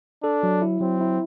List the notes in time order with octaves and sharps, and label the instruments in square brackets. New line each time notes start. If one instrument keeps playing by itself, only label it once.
[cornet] D4 [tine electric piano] A4
[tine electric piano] F#3
E4
[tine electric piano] F#3 [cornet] C4
[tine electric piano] E4